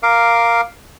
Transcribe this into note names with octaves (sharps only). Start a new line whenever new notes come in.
A#4 F5 D6